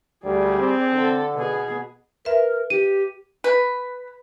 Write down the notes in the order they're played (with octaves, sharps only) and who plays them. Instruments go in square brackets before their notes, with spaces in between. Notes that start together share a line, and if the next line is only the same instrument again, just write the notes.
[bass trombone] D2 [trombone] G3 [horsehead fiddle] G#4 D5
[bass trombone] C4
[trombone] D3 [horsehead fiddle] A4
[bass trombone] B2 [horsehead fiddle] B3 G#4
[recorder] A#4 [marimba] B4 E5
[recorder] G4 [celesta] D#7
[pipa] B4